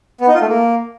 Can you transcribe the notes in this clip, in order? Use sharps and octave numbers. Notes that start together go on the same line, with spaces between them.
B3
D#4
F4
A3
A#3